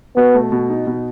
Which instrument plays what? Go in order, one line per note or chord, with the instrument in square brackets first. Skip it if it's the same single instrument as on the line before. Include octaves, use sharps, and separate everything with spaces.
[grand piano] B2 [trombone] B3
[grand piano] A3
B2
D#4
B2